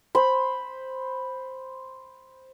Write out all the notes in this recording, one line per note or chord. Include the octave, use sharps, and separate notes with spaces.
C5 B5